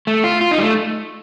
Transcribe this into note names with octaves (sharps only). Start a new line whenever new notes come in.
A3
F4
F4
D#4
G3
A3